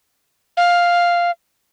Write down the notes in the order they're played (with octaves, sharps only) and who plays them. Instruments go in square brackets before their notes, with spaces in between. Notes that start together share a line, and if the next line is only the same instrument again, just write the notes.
[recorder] F5